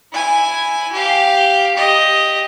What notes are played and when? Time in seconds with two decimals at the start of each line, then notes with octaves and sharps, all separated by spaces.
0.13 E4 G#5
0.92 G4 F5
1.77 G4 D#5